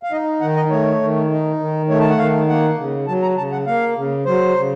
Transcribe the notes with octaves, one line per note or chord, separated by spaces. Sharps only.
F5
D#4 D#5
D#3 F#5
D#5
A3 C#5
D#3
D#4
D#3
A3 C#5
A5
F#5
D#3 F5
A#3 F#5
C#3
F#3 A5
A#5
C#3 A5
F#5
A#3 F5
C#3
F#3 C5
C#3